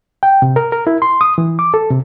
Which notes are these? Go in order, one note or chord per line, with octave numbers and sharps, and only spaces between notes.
G5
C3
A#4
A#4
E4
C6
D#6
E3
D6
A4
C3